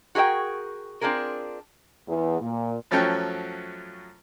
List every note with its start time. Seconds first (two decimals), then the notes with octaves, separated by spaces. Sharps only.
0.15 F#4 G#4 A#4 E5 G5
1.01 C4 D4 F4 G#4 A#4
2.07 E2
2.40 A#2
2.91 F#2 F3 F#3 A3 C#4 G5